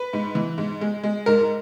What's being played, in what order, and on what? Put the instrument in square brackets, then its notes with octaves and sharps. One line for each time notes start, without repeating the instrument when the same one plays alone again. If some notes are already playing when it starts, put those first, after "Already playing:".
Already playing: [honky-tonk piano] B4
G#2
E3
G#2
G#3
G#3
G#2 A#4